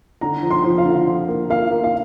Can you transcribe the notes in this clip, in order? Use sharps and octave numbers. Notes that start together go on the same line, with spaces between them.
D3 A#5
F3
C6
F3
F5
D3
F3
A#3
A#3 F5
A#3
F5